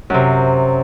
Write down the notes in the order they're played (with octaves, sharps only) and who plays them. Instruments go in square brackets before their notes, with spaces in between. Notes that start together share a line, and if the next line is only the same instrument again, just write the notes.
[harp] F#2 C3